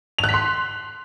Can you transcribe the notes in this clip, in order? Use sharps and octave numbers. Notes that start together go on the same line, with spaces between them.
F7
F#6
B6
C6